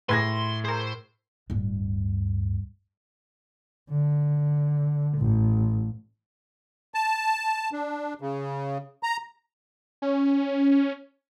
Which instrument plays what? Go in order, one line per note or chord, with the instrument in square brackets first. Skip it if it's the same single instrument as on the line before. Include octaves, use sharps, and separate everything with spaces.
[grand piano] A2 G#6 A#6 [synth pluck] G#4 B4 [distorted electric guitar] C6
[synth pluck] G#4 A#4 [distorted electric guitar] C5
[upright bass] D1 G2
[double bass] D3
A1
[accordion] A5
D4
C#3
A#5
[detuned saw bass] C#4